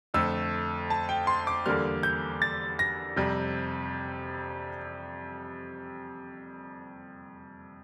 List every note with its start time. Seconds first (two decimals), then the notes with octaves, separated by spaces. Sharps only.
0.14 F2 D3 A3 E6
0.90 A5
1.09 G5
1.27 C6
1.47 D6
1.66 E2 D3 G3 A#3 F6
2.03 G6
2.42 A6
2.79 A#6
3.16 F2 C3 G3